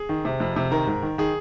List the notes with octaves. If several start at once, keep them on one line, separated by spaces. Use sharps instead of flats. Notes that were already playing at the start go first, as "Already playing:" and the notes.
Already playing: G#4
D#3
C3
F2
C3
D#3 A#4
G#2
D#3
D#3 G#4